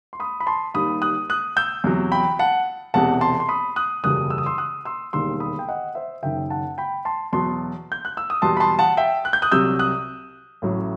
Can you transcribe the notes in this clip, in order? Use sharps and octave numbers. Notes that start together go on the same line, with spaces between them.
C6
B5 D#6
B5
A5 C6
D#2 D#3 G3 B5 D#6
D#6 F#6
D#6 F#6
E6 G6
E2 C3 F#3
G5 B5
F#5 A5
E1 E2 C3 F#5 A5
A5 C6
C6
B5 D#6
D#6 F#6
F#1 E2 B2 G3 D#6 F#6
E6
D#6
C6 E6
D#6 F#6
C6 E6
E1 D#2 D#3 G3 C6 E6
B5 D#6
G5
D#5 F#5
C5 E5
F#1 F#2 D#3 E5 G5
F#5 A5
G5 B5
A5 C6
E2 B2 F#3 A5 C6
G6
F#6
E6
D#6
E2 B2 G3 A5 C6
B5
A5 C6
F#5 A5
E5 G5
F#6
G6
D#6 F#6
C2 C3 F#3 E6 G6
D#6 F#6
A1 A2 F#3